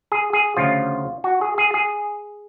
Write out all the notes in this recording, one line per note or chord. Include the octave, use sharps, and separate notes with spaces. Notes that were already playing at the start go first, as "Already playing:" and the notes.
G#4
G#4
D2 C#3 F3 F4
F#4
G#4
G#4
G#4